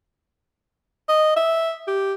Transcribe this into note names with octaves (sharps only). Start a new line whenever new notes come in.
D#5
E5
G4